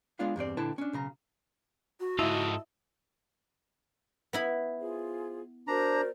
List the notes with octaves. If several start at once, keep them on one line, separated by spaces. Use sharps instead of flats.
G#3 B3 D4 F4 D5 F5
E2 G2 C4 D5
A#2 D3 E4 B4 G5 A5
C#4 D4
B1 C#3 A#5
F#4
G#2 E4 F4 A4 D#5
B3 E4 B5
F4 G#4 C5
D4 F#4 A#4 C5 D5 A#5